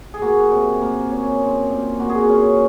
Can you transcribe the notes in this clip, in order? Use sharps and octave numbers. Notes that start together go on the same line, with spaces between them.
G#4
A#3 F#4
C3
A#3
C#4
C4
A#2
A#3 F#4
G#4
F#4
C#4